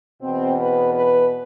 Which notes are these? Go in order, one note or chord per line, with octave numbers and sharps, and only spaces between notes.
E2 B2 C4
B4
B4